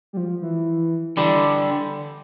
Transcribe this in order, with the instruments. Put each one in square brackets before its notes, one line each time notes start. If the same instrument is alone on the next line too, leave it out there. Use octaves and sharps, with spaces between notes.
[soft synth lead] G3
F3
E3
[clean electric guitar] D3 G3 [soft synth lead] E3